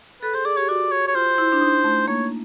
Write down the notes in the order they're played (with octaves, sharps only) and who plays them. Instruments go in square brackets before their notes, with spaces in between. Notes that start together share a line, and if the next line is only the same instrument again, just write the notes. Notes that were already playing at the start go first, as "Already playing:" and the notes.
[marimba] A4 [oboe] B4
[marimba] G#4 [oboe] C5
[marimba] G#4 [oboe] D5
[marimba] G4 [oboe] C#5
[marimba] F#4 [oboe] D5
[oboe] C#5
C#5
[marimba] F4 [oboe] C5
[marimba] E4
D4
D#4
A3
[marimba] A#3 [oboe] C#5